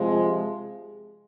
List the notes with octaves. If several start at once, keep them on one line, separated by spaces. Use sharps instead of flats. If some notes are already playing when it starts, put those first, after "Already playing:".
Already playing: C3 F3 G#3